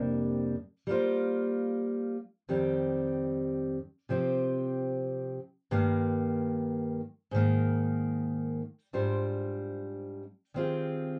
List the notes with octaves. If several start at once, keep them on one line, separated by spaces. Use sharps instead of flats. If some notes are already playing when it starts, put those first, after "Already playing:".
Already playing: F2 C3 G3 A#3 D4
G3 A#3 F4 C5
F2 D#3 G3 C4 G4
C3 F3 C4 G4
G2 D#3 A#3
G#2 D#3 A#3
G#2 G3 D4 F4 C5
D#3 G3 C4 F4 G#4